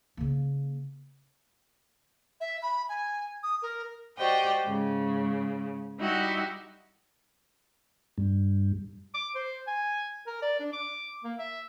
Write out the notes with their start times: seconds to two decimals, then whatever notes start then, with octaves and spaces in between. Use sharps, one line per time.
0.17 C#3 A#3
2.41 E5
2.62 B5
2.89 G#5
3.43 D#6
3.62 A#4
4.17 F#4 G4 C5 D5 D#5 G5
4.63 G#2 C#3
5.97 G3 D#4 E4 F#4 G4
8.18 G2
9.14 D6
9.35 C5
9.67 G#5
10.27 A#4
10.42 D5
10.60 D4
10.73 D6
11.24 A#3
11.39 E5